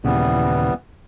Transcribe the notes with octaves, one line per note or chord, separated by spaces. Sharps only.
D#2 A#2 C#3 E3 G3 B3